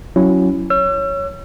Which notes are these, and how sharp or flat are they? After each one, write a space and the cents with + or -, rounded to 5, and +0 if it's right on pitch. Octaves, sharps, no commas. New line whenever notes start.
F#3 +0 C#4 +0 E4 +10
C#5 +0 E6 +40